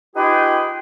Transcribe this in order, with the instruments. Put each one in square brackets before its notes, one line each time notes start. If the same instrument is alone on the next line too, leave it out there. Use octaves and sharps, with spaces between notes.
[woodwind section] D#4 F4 G4 G#4 B4 G5